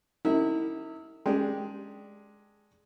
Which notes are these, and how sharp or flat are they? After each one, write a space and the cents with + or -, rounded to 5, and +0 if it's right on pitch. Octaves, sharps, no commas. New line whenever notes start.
D#3 -40 E4 -30
G#3 +5 D4 +0 G4 +0